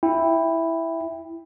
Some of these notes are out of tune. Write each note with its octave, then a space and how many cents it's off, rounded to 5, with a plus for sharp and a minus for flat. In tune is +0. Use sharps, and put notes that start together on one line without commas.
E4 +0 G5 +15